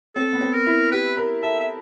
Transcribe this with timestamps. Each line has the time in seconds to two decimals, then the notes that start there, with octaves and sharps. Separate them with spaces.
0.16 C4 A4
0.33 B3
0.41 C4
0.53 A#4
0.66 E4
0.92 G4 B4
1.17 A#4
1.42 A4 E5
1.60 E5